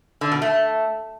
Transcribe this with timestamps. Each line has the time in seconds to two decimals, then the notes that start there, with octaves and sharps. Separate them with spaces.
0.21 D3
0.31 B2
0.42 A3